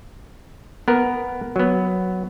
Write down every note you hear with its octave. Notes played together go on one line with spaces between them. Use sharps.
B3 A#4
F#3 B3